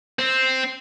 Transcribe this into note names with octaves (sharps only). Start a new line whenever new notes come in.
C4